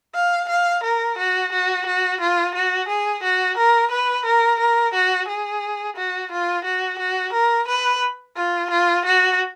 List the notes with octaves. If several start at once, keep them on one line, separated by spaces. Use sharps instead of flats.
F5
F5
A#4
F#4
F#4
F#4
F4
F#4
G#4
F#4
A#4
B4
A#4
A#4
F#4
G#4
F#4
F4
F#4
F#4
A#4
B4
F4
F4
F#4